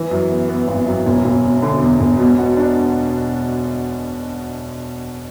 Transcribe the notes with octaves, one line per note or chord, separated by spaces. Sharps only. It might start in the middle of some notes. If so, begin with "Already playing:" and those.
Already playing: E3
F#2
B3
B3
G#1
F#2
E1
E1
E2
D3
E2
E1
B2
F#4
D4